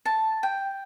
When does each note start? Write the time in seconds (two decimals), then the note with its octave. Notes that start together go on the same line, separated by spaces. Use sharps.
0.05 A5
0.43 G5